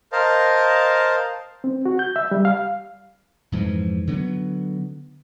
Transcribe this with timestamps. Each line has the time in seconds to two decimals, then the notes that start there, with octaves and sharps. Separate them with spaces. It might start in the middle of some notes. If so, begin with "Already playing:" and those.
0.12 A#4 C5 D#5 F5 A5
1.64 C4
1.85 F#4
1.99 G6
2.16 E5
2.31 G3
2.45 F5
3.52 F2 G#2 E3 F3
4.07 D3 F#3 B3